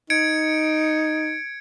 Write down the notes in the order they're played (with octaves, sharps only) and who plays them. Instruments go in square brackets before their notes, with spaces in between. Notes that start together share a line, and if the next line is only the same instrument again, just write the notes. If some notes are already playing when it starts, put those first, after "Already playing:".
[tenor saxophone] D#4 [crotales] G#6 C#7 D7